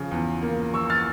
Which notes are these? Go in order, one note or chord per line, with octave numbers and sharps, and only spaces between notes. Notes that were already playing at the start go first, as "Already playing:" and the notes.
Already playing: C#3 F3
E2
A#3
F3 C#6 E6
F6 A6